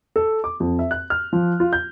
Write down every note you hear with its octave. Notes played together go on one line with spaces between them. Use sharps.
A4
D6
F2
E5
F#6
F6
F3
F4
G6